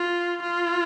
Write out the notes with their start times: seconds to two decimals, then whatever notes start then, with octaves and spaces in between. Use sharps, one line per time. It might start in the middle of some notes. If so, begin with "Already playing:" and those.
Already playing: F4
0.42 F4